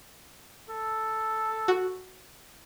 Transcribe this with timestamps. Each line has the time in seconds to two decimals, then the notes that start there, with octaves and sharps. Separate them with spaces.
0.69 A4
1.68 F#4